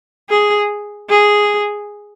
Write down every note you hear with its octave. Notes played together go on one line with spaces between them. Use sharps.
G#4
G#4